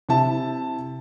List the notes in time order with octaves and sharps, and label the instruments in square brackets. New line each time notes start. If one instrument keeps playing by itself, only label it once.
[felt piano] C3 E4 A5